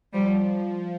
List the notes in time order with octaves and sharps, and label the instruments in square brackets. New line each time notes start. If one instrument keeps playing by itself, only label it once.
[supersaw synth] F3 [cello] G3